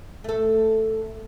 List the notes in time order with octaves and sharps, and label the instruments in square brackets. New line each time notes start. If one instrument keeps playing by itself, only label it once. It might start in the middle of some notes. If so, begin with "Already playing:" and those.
[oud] A3 A4